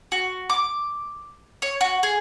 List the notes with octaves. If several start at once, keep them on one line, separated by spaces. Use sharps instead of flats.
F#4
D6
C#5
F#4
G#4